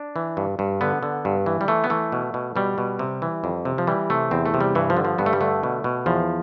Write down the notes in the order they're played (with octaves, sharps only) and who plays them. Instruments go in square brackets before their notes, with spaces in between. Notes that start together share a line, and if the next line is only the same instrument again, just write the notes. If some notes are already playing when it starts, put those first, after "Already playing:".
Already playing: [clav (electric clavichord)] D4
E3
G2
G2
D3 B3
D3
G2
E3
G3
E3 A3
B3
E3 A3
B2
B2
B2 G3
B2
C3
E3
F2
C3
F3
E3 G3
C3 A3
E2 C4
A3
C3
G3
G2 E3
F3
D3
F3
G2 B3
A3
G3
D3 A3
B2
B2
E2 F3